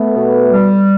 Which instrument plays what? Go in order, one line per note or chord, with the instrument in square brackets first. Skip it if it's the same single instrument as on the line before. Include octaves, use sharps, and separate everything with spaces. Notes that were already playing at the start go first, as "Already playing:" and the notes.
Already playing: [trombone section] A3 B3
[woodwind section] B2
G3